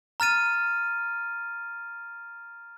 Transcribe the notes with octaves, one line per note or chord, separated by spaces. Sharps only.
A#5 F6 A6 D#7